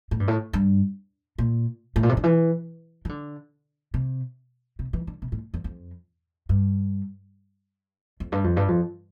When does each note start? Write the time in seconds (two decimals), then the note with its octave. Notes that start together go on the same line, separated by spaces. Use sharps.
0.11 A2
0.20 G2
0.28 A2
0.53 G2
1.38 A#2
1.96 A2
2.03 A#2
2.09 C3
2.17 D3
2.23 E3
3.05 E3
3.09 D3
3.94 C3
4.79 C3
4.93 E3
5.07 D3
5.22 C3
5.32 A2
5.54 E2
5.64 F2
6.49 G2
8.20 F2
8.32 G2
8.44 F2
8.57 G2
8.68 F2